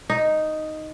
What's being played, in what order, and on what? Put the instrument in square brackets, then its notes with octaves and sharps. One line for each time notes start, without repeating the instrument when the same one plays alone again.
[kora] D#4